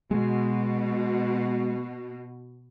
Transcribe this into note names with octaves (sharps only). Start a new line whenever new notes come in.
B2 G#3